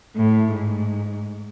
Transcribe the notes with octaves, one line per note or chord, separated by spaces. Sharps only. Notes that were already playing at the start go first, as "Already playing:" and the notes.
A2
G#2